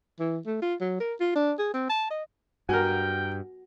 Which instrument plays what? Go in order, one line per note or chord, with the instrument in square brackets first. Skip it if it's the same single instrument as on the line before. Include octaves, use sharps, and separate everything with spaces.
[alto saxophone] E3
A3
F4
F#3
A#4
F4
D4
G#4
C4
A5
D#5
[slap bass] G2 [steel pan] F#4 [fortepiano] A#4 G#5 [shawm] G5